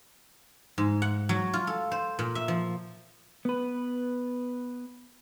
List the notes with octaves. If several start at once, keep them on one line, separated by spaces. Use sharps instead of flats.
G#2
F#5
F#3
F4
A4
C5
A#2
E5
F3
B3 B4